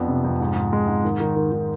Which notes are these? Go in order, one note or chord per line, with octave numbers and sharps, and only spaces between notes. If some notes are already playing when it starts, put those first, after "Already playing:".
Already playing: F2 B3 D4
C3
F2
G#2
G#2
G#3
G#2
D#3
D#3
D#3
D#3